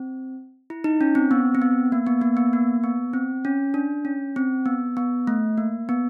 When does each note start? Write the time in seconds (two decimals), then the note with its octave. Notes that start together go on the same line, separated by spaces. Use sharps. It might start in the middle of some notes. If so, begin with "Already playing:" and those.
Already playing: C4
0.70 E4
0.84 D#4
1.01 C#4
1.15 C4
1.31 B3
1.55 C4
1.62 B3
1.92 A#3
2.07 B3
2.21 A#3
2.37 B3
2.53 A#3
2.84 B3
3.13 C4
3.45 C#4
3.74 D4
4.05 C#4
4.36 C4
4.66 B3
4.97 B3
5.27 A3
5.58 A#3
5.89 B3